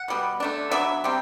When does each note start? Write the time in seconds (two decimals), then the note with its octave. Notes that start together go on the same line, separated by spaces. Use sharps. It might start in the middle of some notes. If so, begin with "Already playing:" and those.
Already playing: F#5
0.08 B2 G3 B3
0.40 D3 A3 D4
0.71 F#3 B3 D4 E5
1.04 C3 G3 C4